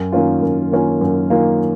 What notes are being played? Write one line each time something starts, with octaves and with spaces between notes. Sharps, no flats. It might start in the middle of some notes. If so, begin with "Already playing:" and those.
Already playing: F#2
D#3 A#3 C#4 F4
F#2
D#3 A#3 C#4 F4
F#2
D#3 A#3 C#4 F4